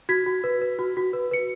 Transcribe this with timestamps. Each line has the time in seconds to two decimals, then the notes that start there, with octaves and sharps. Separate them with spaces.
0.09 F#4 G#6 B6
0.26 F#4
0.44 B4
0.62 B4
0.79 F#4
0.97 F#4
1.13 B4
1.31 B4 C#7